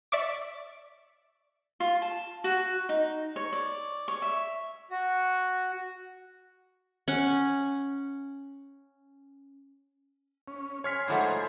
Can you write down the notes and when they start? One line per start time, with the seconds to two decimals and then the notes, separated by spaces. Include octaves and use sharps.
0.12 D5 E5 C#6 D6
1.80 F4
2.02 A5
2.44 F#4
2.89 D#4
3.36 C#5
3.53 D5
4.08 C#5
4.22 E5
4.91 F#4
7.08 C#4 F#5
10.48 C#4
10.84 C#5 G#5 C6 F6 B6
11.08 G#2 F3 A3 E4 F#4 D#5